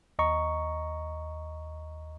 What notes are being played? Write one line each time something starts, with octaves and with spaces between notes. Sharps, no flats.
D#2 D#5 A#5 C#6